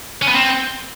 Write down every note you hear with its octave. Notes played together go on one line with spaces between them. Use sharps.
C#4
B3
C4